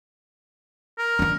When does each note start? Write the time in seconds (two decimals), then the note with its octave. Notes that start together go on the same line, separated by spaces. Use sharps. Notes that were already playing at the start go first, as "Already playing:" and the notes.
0.98 A#4
1.19 E3 D4